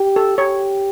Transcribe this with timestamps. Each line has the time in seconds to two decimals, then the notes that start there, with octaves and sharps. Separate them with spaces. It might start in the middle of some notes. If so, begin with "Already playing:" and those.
Already playing: G4
0.16 A4
0.38 G4 C#5